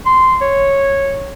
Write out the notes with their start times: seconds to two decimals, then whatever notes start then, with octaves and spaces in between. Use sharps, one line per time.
0.06 C6
0.41 C#5